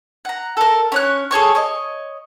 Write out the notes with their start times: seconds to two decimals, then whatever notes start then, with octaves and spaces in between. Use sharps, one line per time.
0.25 F#5 A#5
0.57 A4 A#4
0.92 C#4 C#5 F#6
1.31 G#4 A4 C#5 C#6
1.55 C#5 D#5